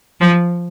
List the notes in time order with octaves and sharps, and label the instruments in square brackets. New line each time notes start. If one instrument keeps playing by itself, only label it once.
[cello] F3